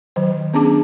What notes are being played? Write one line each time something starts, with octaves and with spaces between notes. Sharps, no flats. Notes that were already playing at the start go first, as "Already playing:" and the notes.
D#3 F#3 C5
B3 C#4 D4 G#4 A5 D6